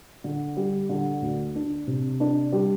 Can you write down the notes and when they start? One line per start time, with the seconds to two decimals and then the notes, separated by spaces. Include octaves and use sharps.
0.24 D3
0.57 G3
0.89 D3
1.22 D2
1.55 D4
1.87 C3
2.20 D4
2.52 G3